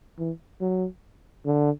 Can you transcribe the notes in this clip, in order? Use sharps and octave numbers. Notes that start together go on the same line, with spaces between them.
E3
F#3
D3